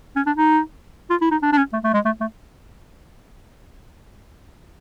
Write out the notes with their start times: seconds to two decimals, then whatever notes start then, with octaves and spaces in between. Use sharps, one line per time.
0.16 C#4
0.27 D4
0.37 D#4
1.10 F4
1.22 E4
1.31 D#4
1.43 D4
1.53 D4
1.57 C#4
1.73 A3
1.84 A3
1.94 G#3
2.05 A3
2.21 A3